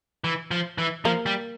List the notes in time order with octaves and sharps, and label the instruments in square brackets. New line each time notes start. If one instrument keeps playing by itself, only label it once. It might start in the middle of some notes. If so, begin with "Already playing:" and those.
[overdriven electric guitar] E3
F3
E3
[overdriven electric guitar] F3 [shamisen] A#3
[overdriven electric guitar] G3